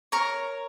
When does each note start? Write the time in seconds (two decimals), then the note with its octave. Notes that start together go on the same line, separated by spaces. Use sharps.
0.12 A#4 C#5